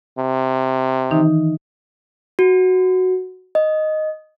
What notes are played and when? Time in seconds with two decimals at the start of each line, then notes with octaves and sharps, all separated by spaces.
0.18 C3
1.11 D#3 E3 D#4
2.39 F#4
3.55 D#5